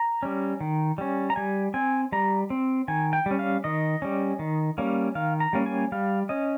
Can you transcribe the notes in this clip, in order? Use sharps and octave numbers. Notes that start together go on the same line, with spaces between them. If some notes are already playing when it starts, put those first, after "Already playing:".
Already playing: A#5
G3 C#4
D#3
G3 C#4
A#5
G3 G#5
C4 G#5
G3 A#5
C4
D#3 G#5
G5
G3 C#4
F5
D#3 D#5
G3 C#4
D#3
G3 A#3 C#4
D#3 F5
A#5
G3 A#3 C#4
G#5
G3 F5
C#4 D#5